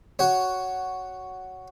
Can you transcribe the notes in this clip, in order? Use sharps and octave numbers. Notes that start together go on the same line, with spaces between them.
F#4 C#5